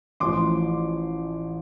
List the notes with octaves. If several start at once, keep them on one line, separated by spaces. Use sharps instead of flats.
A1 A2 F3 C6 D6